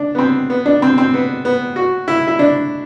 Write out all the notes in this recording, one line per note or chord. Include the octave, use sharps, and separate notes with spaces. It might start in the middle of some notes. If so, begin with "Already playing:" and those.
Already playing: D4
B3
C4
B3
D4
C4
C4
B3
B3
F#4
E4
E4
D4